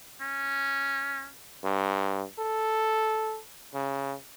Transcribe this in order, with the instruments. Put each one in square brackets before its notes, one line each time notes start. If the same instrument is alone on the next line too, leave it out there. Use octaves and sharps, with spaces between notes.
[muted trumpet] C#4
[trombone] G2
A4
C#3